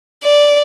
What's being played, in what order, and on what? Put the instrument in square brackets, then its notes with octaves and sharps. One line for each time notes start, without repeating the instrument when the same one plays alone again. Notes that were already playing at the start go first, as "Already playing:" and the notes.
[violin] D5